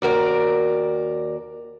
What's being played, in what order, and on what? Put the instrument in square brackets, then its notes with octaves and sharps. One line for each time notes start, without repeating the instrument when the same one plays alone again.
[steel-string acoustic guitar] D#2 F#4 A#4 D5